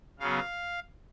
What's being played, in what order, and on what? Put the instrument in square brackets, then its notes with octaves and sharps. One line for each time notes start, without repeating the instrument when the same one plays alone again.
[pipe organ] C#3 F#3 B3 F5